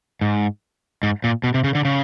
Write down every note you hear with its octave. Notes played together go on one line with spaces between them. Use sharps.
G#2
G#2
A#2
B2
C3
C#3
D3
C#3